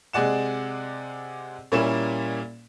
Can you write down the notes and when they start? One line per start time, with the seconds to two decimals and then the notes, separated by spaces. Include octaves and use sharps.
0.13 C3 G#3 G#4 D5 F#5 E7
1.72 A#2 G3 A#3 C#4 E4 E7